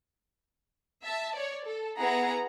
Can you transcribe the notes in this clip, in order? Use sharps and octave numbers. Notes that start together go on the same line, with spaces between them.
E5 A5
C#5 D5
A4
B3 E4 G#4 F#5 A#5